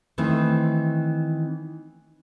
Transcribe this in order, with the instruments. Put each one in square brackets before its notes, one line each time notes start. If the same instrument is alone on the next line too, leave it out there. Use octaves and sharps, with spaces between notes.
[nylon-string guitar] D#3 E3 A3 C4